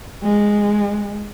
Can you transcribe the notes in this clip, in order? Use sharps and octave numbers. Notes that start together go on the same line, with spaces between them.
G#3